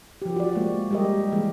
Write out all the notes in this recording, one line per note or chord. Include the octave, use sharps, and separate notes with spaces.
F3 G4
F#4 D5
G#3 A#3
G3 G#3 G4 A#4 D#5
E3 G#3 A#3